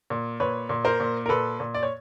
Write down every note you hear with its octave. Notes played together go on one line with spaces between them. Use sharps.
A#2
A#2 B4 C#5
A#2
A#4 C5
A#2
A#4
A#2 A4 B4
A#2
D5
C#5